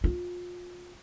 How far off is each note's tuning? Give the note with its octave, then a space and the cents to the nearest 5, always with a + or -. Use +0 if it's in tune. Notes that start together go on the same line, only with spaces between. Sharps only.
F4 +30